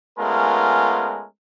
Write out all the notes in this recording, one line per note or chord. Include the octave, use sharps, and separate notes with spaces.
G#3 A3 B3 C#4 F4 A#4